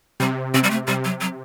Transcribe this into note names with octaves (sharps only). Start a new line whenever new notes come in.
C3 G3
C3 C4
G3
A3
C3 G3
F#3
F#3